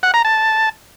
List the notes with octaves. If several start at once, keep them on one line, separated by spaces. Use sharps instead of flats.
F#5
A#5
A5